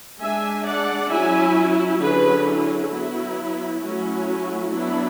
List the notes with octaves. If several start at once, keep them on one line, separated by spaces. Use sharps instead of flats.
G#3 D4 E5 G#5
D5 F#5
F#3 C#4 E4 E5 G#5
D3 F#3 C#4 G#4 B4
E4 G#4
F#3 B3 E4 F#4
F#3 A3 C#4 E4 F#4
F#4
F#3 B3 D4 E4